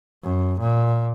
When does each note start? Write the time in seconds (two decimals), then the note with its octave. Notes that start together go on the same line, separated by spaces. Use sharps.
0.24 F#2
0.60 A#2